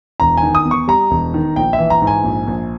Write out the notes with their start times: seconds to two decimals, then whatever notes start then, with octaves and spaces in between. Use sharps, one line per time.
0.20 E1 A#5
0.37 D#3 G#5
0.55 D#6
0.65 E2
0.71 C#6
0.88 G3 A#5
1.11 E1
1.34 D#3
1.56 A#1 G5
1.73 E5
1.79 E3
1.90 A#5
2.02 G#2
2.07 G#5
2.24 A#1
2.47 A#1